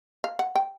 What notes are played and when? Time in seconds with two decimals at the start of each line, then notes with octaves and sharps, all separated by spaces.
0.24 F5
0.39 F#5
0.55 G5